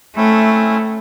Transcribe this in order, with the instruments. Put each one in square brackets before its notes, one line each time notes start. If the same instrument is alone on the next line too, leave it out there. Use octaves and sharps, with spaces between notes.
[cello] A3 [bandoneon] C4 C#4 E4